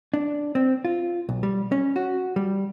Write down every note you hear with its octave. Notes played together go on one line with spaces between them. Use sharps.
D4
C4
F4
B1
G3
C#4
F#4
G3